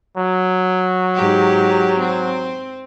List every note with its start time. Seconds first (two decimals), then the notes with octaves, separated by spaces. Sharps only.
0.17 F#3
1.15 G#2 G4
1.99 C4